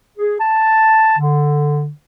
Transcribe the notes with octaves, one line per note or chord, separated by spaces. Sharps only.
G#4
A5
D3